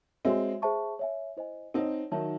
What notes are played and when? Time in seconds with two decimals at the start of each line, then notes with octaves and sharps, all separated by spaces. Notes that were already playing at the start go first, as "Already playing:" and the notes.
0.25 G#3 C4 F#4 C#5 E5
0.62 G#4 C5 E5 A5 C#6
0.99 C#5 E5 G#5
1.37 E4 C5 D#5 G#5
1.74 C4 D#4 C#5 F#5 A5
2.11 D#3 F#3 D#4 F#4 C#5 E5 A5